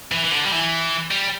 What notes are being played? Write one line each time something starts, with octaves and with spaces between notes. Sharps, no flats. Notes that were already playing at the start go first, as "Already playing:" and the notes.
E3
E3
D3
G3
E3
G3